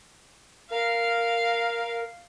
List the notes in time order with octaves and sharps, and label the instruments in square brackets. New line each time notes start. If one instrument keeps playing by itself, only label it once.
[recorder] A#4 [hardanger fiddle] F5